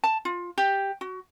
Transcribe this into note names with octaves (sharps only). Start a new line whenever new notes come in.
A5
F4
G4
F#4